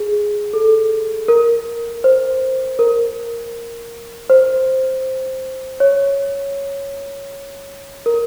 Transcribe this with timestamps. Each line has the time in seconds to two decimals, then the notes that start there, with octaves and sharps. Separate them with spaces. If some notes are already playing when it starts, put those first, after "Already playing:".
Already playing: G#4
0.53 A4
1.28 A#4
2.04 C5
2.79 A#4
4.30 C5
5.80 C#5
8.06 A#4